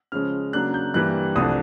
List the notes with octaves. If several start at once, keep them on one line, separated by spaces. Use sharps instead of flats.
C#3 F3 G#3 C#4 F6
C#3 F#3 A#3 D4 F#6
G6
G2 E3 G3 A#3 F#6
C2 C3 F3 A3 D4 D#6